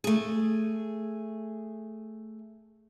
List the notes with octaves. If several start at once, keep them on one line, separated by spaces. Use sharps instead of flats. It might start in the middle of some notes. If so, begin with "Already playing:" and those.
A3 G#4